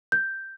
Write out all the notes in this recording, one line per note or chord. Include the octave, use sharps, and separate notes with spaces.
G6